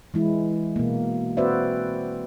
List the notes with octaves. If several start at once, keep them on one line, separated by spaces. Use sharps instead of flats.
E3 G#3 E4
B2 A#3
C4 F#4 B4 C5 D5 E5